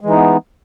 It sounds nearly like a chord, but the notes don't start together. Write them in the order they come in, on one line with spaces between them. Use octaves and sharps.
G#3 E3 D#4 B3